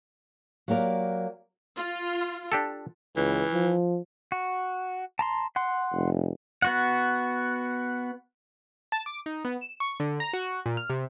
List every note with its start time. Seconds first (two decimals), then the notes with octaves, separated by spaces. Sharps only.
0.68 F#3 A#3 G4 A#4 D5
1.76 F4
2.52 D4 G4 A4
3.16 C#2 E3
3.53 F3
4.32 F#4
5.19 A5 A#5 C6
5.56 F#5 C6
5.92 F1
6.62 B3 F#4 F#5
8.92 A5
9.06 D6
9.26 D#4
9.45 B3
9.61 E7
9.80 C#6
10.00 D3
10.20 A#5
10.33 F#4
10.66 A#2
10.77 F6
10.90 C3